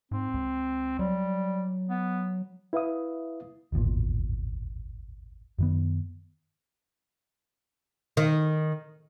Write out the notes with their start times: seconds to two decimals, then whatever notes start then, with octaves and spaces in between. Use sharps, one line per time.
0.11 G#2 C4
0.34 C#2
0.99 F#3 G3
1.89 B3
2.73 E4 B4 E5 F5 D#6
3.72 D1 G#1 E2 A#2
5.59 F#2 D#3 B3
8.17 D#3